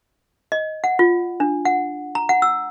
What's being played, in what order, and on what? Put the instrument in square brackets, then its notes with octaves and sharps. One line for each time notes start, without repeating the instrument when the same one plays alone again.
[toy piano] D#5
F#5
F4
D4
F#5
A#5
F#5
E6